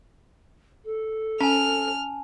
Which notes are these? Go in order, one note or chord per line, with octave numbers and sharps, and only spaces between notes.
A4
C#4 G#5 A5 F6